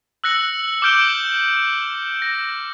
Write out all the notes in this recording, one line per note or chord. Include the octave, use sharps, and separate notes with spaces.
E6 F#6 A#6 C#7 F#7
D6 F6 G6 D7 E7 G7
A#6